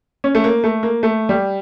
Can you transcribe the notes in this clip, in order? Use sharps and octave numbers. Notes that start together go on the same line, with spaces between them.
C#4
A3
A#3
A3
A#3
A3
G3